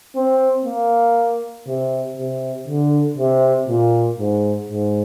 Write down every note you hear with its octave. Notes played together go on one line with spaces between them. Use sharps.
C4
A#3
C3
C3
D3
C3
A#2
G#2
G#2